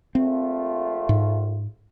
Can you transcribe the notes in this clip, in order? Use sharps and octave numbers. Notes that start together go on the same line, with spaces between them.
A#1 A3 C4 F4
G#2